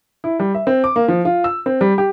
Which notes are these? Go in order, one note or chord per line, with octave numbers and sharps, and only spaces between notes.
E4
G3
E5
C4
D6
A#3
F3
F4
E6
C4
G3
G4